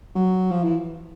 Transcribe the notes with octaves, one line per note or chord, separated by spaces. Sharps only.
F#3
F3
E3